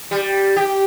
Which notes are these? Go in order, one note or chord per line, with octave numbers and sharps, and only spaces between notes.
G3
G4